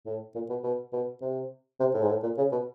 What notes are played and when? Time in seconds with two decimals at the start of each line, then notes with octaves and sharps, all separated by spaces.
0.06 A2
0.35 A#2
0.50 B2
0.64 B2
0.93 B2
1.22 C3
1.80 C3
1.94 A2
2.02 G#2
2.09 A2
2.23 A#2
2.38 C#3
2.52 B2